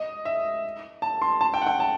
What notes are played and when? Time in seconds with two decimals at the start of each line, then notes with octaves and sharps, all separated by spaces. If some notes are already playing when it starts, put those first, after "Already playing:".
Already playing: D#5
0.25 E5
1.02 A5
1.22 C6
1.41 A5
1.54 G5
1.62 F#5
1.67 G5
1.80 A5